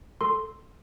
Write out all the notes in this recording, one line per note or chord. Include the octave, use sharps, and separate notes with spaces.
A4 C6